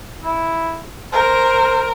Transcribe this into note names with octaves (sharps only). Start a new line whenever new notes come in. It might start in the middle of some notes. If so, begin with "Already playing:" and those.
E4
A#4 C5